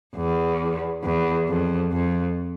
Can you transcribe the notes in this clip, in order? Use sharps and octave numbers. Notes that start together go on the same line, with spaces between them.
E2
E2
F2
F2